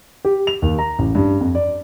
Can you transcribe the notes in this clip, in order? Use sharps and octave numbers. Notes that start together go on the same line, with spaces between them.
G4
F7
D#2
A#5
A1
G2
F2
D5